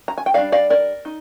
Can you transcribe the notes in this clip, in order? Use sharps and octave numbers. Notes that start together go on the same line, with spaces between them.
A#5
G#5
G5
G3 D4 D5 F5
D5 F5
A#4 D5
D#4